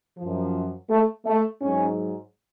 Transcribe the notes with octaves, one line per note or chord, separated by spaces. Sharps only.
F#2 F3
A3
A3
G#2 F#3 C#4